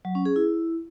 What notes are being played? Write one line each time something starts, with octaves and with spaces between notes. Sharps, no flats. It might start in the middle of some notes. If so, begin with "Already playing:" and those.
F#3
C#4
G#4
E4